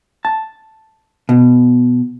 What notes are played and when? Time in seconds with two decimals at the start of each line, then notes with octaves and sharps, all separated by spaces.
0.25 A5
1.29 B2